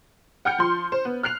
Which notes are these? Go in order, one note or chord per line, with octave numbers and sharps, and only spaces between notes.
F#5 G5 F6 G6 C#7
F3 C6
C5
B3
F6 F#6 C7 F7